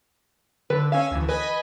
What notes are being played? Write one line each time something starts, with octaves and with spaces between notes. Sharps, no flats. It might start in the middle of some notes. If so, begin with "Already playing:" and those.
D3 B4
C#4 F5 G#5 E6
D2 E3
B4 D#5 G#5 B5